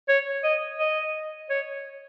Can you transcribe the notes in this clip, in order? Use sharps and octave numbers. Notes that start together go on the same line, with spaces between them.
C#5
D#5
D#5
C#5